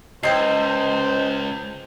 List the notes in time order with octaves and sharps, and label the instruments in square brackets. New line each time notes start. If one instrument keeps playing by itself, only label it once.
[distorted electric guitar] C#2 [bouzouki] D#4 A5 [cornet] C5 [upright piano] G5 G6 C7